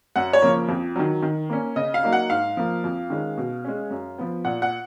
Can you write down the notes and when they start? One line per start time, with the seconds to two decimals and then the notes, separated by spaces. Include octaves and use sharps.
0.16 F#2 F#5
0.33 C#5
0.42 C#3 F3 A#3
0.69 F2
0.96 D#3 F#3
1.22 D#3
1.50 A#3 C#4
1.76 C#3 D#5
1.94 F5
2.03 F#3 A#3 D#4
2.13 F#5
2.30 G#2 F5
2.57 F3 A#3
2.84 F2
3.10 D#3 G#3 C#4
3.37 B2
3.64 G#3 C#4
3.91 F#2
4.18 F3 B3
4.45 A#2 F#5
4.62 F#5